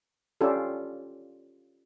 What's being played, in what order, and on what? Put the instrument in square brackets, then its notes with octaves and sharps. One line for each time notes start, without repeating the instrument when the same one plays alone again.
[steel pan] C#4 D4 F4 G4 A4